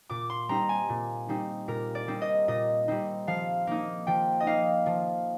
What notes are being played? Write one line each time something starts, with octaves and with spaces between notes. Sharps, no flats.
A#2 D6
C6
G3 C4 D#4 A#5
G#5
A#2
G3 C4 D#4
A#2 A#4
D5
G3 C4 D#4
D#5
A#2 D#5
G3 C4 D#4
F3 F5
A#3 D#4
F3 G5
D#5
A#3 D#4 F5
F3